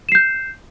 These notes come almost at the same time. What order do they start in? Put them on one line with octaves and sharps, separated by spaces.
E7 C7 G6